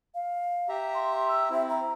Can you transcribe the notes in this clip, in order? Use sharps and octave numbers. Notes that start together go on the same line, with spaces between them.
F5
G4 E5 A#5
C6
E6
C4 E4 E5
A#5